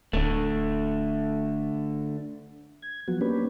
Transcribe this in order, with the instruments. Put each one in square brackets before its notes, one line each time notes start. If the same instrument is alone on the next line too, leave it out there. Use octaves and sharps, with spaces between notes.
[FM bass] D1 [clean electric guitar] D3 A3
[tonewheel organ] G#6
F3 F#3 B3 F#4
A#3 B3 C#4 D4 G4 B4